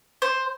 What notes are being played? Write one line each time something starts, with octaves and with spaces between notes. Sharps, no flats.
C5